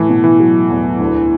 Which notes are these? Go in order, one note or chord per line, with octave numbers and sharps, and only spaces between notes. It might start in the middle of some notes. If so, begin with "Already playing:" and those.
Already playing: A2 E3 A3
B2
E3
F#3
E2
D2